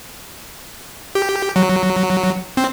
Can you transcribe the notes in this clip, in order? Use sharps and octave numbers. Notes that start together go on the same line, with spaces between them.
G4
F#3
C4